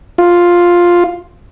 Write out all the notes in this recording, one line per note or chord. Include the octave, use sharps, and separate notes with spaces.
F4